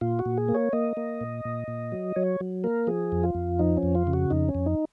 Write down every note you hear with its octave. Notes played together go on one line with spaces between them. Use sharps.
A#2 F4
F#4
A#2
G#4
A#3
C#5
A#3 D#5
A#3
A#2
A#2
A#2
F#3
F#3 C#5
F#3
A#3 A#4
F3 G#4
F2
F4
F2
F3 D#4
C#4
F2
F4
C#3
F#4
F2 D#4
C#4
F2
D#4